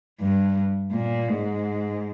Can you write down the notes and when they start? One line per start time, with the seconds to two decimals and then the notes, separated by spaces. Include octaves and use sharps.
0.21 G2
0.92 A#2
1.29 G#2